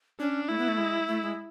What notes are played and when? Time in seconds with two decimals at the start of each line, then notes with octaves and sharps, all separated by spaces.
0.20 C#4 D4
0.49 A3 E4
0.58 B3
0.68 A3
0.78 G#3
1.07 A3
1.22 G#3